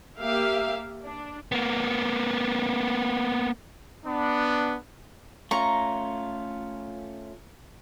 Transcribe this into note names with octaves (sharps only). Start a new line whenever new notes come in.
A#3 G4 E5 F5
D4
A#3 B3
B3 D4
A3 C#4 F4 A#5 C#6